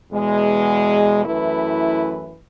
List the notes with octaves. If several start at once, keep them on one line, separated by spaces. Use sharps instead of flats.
E2 B2 G#3
F#2 E3 A3 E4 B4